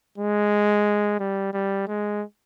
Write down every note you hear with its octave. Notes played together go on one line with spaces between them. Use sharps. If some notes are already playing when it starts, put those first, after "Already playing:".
G#3
G3
G3
G#3